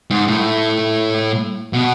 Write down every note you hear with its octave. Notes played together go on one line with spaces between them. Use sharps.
G#2
A2
B2